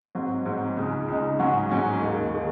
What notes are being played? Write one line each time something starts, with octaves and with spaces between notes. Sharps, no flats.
G#2 F#3 C4
G#2 F#3 C4
C#2 C#3 G#3 D#4
C#2 C#3 G#3 D#4
G#2 F#3 C#4 F#4
G#2 F#3 C#4 F#4
D#2 D#3 A#3
D#3 A#3